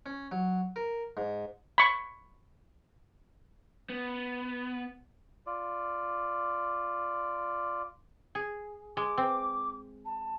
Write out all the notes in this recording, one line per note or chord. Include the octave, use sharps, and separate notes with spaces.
C#4
F#3
A#4
G#2
B5 C#6
B3
F4 D5
G#4
G#3 D6
C4
A5